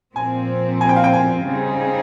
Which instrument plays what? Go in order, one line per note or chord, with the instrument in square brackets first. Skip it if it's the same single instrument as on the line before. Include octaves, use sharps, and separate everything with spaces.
[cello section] A#2 F3 C4 [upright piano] G#5
[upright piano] G#5
G5
F5
G5
G#5
[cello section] C#3 G3 C4 D#4 G#4